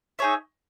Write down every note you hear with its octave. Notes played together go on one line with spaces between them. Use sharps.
D#4 G#4 C#5 E5